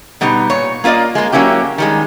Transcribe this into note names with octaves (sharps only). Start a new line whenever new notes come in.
B2 G3 B3 D#4
A#2 C#5
A#3 F4 A#4 D5 D#5
G#3 A#3
F#3 A#3 C#4 E4 G4
D#3 G3 G#3